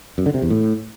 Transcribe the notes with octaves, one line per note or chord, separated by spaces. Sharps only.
F#2
D3
C3
E2
A2